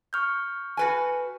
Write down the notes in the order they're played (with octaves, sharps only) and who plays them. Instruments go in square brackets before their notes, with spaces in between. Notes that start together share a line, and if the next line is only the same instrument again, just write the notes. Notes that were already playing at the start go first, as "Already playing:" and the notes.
[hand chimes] C#6 F6 G6
[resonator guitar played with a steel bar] F#4 B4 G#5